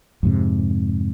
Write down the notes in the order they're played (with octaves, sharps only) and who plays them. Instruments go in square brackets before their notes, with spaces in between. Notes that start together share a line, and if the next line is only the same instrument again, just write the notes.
[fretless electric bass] F2 G#2 C3